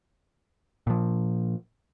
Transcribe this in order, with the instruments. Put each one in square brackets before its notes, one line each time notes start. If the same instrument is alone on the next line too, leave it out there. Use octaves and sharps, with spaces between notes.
[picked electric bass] A#2 F3